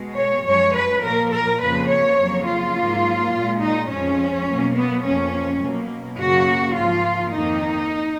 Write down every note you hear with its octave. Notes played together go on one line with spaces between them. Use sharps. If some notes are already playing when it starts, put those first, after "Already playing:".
Already playing: B2 G#3
C#5
F#2 F3 G#3 C#5
B4
A#2 F3 A#3 A#4
A#4
F2 C#3 F3 A#3 B4
C#5
F2 C#3 F#3 A#3
F4
G#2 F#3 A#3
A#2 G#3
D#4
F2 F3 G#3 C#4
B2 F#3 A#3
B3
F2 F3 A#3 C#4
B2 F#3 A#3
F#2 C#3 F#3 A#3 F#4
G#2 F3 A#3 F4
F2 D#3 A#3 D#4